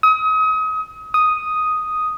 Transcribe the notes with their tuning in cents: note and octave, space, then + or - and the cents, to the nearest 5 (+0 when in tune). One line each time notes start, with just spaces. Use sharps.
D#6 +35
D#6 +0